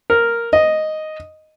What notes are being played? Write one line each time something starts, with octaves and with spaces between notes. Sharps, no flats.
A#4
D#5